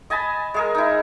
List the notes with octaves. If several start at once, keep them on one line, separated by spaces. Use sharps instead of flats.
D#5 G#5 A5 B5
G#3 G#4 A#4
D#4 E4